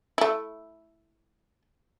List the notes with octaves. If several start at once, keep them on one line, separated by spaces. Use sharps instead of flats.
A3 E4